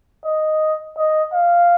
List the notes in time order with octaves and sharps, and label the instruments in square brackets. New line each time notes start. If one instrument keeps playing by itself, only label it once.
[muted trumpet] D#5
D#5
F5